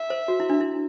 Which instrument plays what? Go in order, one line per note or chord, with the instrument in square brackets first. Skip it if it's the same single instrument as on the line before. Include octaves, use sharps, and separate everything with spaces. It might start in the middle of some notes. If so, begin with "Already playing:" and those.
Already playing: [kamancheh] E5
[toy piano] C5
F#4
E4
D4
E4